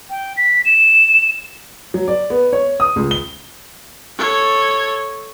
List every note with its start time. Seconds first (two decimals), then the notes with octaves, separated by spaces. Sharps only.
0.10 G5
0.37 B6
0.65 E7
1.94 F#3
2.08 D5
2.30 B3
2.53 C#5
2.80 D#6
2.96 C#2
3.11 G7
4.18 A4 C#5